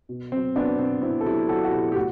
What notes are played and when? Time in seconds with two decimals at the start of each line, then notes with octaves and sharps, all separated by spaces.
0.09 B2
0.32 F#3 C4
0.56 F#3 B3 D4
0.78 B2 C4
1.02 B2 C4 E4
1.21 A4
1.26 F#3 E4 G4
1.49 F#3 F#4 A4
1.64 F#4
1.72 B2 E4 G4
1.92 G4
1.96 A2 F#4